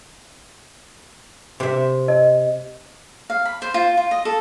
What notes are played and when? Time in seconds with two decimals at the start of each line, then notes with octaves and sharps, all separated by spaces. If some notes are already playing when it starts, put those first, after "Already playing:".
1.60 C3 E5
2.08 D#5
3.30 F5
3.45 B5
3.62 C5
3.74 F4
3.97 F4
4.11 D#5
4.25 A4